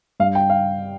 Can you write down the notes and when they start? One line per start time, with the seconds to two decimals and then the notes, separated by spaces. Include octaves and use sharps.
0.20 G2 F5
0.35 G5
0.50 F5